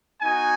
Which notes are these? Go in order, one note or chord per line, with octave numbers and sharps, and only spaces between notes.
B3 D#4 F#4 G#5